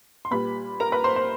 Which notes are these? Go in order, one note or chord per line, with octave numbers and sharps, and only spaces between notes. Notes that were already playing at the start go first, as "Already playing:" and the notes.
C6
A#2 G3 B4 B5
A#4 A#5
B4 B5
C5 C6
C5 C6